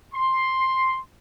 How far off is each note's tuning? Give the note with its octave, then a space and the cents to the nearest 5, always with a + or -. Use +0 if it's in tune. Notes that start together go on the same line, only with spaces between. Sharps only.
C6 +5